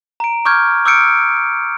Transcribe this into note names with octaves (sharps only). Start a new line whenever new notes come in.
A#5 D7
C#6 D6 F6 G6 G#6
D6 E6 F6 G6 C#7 D7